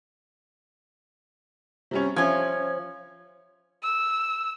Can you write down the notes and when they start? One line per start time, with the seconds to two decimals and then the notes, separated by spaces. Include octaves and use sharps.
1.91 C3 G3 C#4
2.16 F3 C#4 E5 G#6
3.83 E6